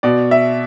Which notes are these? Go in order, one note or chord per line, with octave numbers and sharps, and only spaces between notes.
B2 D5
E5